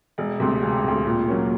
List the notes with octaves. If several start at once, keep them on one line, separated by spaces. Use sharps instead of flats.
E1
D2 C3
E1
D2 C3
A#2
F#3 A#3 C#4